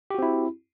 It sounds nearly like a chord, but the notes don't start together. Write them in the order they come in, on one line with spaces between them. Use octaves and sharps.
G4 F#4 C4 E4